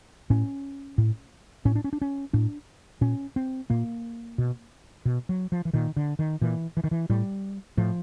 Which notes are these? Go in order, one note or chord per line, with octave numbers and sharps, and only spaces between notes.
A2 C#4
A2
A2 C#4
D4
C#4
D4
C#4
A2 D4
A#2 C#4
C4
A#2 A#3
B2
B2
F#3
F3
E3
A#2 D#3
D3
D#3
A#2 E3
E3
D#3
E3
A2 G3
A2 F3